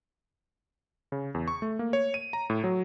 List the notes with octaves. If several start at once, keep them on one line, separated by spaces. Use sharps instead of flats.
C#3
E2
C#6
A3
A#3
C#5
D#7
A#5
A2
F#3